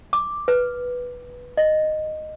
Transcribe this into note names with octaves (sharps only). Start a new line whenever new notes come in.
D6
B4
D#5